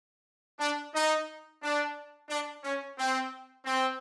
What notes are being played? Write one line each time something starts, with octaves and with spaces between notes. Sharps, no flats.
D4
D#4
D4
D4
C#4
C4
C4